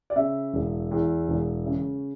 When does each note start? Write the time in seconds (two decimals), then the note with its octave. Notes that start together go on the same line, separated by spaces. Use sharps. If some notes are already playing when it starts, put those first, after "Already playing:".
0.10 D5
0.16 C#3 E5
0.53 E1
0.91 E2
1.29 E1
1.67 C#3